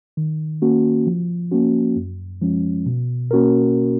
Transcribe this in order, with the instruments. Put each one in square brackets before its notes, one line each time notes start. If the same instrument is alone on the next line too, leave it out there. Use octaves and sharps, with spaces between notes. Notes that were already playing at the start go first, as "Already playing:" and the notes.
[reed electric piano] D#3
A#3 C#4 F#4
F3
A#3 C#4 F#4
F#2
F3 G#3 C#4
B2
A#3 C#4 F#4 A#4